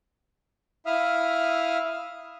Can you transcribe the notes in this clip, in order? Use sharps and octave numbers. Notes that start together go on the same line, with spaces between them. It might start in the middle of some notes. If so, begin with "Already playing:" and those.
E4 E5 F5 D#6 F6